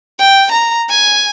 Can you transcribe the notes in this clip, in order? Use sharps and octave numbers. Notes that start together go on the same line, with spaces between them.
G5
A#5
G#5